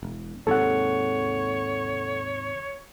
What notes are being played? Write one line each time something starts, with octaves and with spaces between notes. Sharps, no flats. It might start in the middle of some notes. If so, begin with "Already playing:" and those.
E1
D#2 G#2 C3 A4 C#5 F#5